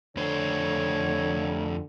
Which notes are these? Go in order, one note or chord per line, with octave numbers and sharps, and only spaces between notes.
F2 D3 A3 C5 C#5